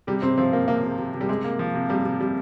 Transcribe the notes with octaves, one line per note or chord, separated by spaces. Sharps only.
C3 G3
C3 C4
F3 C4
C3 A#3
C3 A#3
C3
C3
C3
G3
C3 G#3
A#3
F3
C3
C3 G3
C3
C3 G3